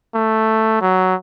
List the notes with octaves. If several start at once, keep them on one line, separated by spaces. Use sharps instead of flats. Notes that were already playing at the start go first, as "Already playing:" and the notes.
A3
F#3